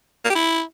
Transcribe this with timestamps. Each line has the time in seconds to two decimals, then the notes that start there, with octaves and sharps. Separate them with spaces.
0.25 A#3
0.30 G4
0.35 E4